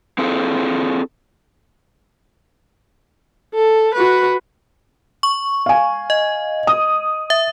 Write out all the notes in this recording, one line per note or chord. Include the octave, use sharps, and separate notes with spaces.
C4 E4 F4 G#4 A4
A4
F#4 B4
C#6
F5 G#5
D#5
D#6
E5